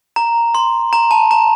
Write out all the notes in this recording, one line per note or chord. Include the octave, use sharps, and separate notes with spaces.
A#5
C6
A#5
A5
A#5